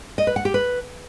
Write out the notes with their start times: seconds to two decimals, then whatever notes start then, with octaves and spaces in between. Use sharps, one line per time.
0.18 D#5
0.27 B4
0.36 F#5
0.45 G4
0.54 B4